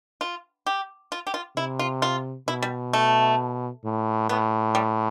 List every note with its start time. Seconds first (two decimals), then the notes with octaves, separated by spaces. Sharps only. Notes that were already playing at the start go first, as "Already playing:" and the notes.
0.21 F4
0.66 G4
1.12 F4
1.27 G4
1.34 F4
1.56 C3 E4
1.79 F4
2.02 F4
2.48 B2 E4
2.62 G3
2.93 A3
3.84 A2
4.29 A2 B3
4.75 G3